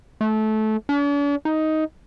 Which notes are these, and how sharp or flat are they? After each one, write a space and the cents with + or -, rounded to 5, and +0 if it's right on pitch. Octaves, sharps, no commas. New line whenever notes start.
A3 -20
D4 -45
D#4 +10